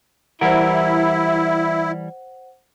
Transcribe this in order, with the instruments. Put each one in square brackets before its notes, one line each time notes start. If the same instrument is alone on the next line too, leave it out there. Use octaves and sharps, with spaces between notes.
[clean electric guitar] E3 G3 A#4 [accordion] E4 [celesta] C5 F#5